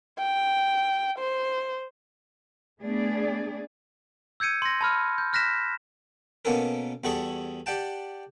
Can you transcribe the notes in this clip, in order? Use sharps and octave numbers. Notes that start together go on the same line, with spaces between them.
G5
C5
A3 B3 D4 G#4 D5
E6 G6 G#6 C#7 D#7
C6 A#6
A5 B5 F6
G6
F6 F#6 A#6 B6 E7
B2 A#3 B3 C#4 A4 A#4
E2 G3 F#4 G#4 A4 C#6
G4 D5 F#5 G5 A5